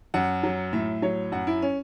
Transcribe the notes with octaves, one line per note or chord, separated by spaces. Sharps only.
F#2 F#5
F#3
A2 E5
F#3 C#5
F#2 F#5
E4
C#4